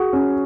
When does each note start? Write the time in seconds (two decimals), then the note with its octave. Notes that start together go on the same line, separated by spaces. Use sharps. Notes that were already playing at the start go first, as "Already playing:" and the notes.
Already playing: F#4 G#4
0.13 C#4